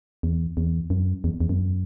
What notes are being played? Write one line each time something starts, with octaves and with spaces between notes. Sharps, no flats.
E2
E2
F#2
E2
E2
F#2